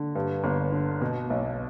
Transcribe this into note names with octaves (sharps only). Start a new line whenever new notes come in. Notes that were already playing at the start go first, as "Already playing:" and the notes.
Already playing: D3
G2
G1
D3
B2
B1